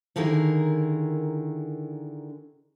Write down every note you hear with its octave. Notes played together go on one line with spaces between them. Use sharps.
D3 D#3 E4 G#4 A#4